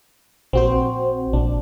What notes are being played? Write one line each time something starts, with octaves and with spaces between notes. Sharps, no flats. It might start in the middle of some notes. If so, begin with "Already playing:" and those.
A#1 C4 F#4 C5
A#1 D4